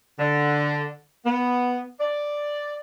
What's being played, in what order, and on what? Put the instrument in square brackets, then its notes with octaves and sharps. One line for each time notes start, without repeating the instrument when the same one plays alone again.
[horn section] D3
B3
D5